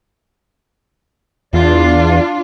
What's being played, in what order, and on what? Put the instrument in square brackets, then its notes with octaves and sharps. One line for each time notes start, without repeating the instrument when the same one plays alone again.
[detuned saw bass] E2 [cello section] D4 F4